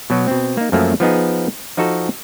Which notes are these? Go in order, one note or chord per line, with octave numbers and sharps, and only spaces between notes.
B2 F#3
B2 C4
A#3 D#4
F#2 F3 F#3 A3 A#3
F3 B3 D#4 G#4
F3 D#4 F#4 A4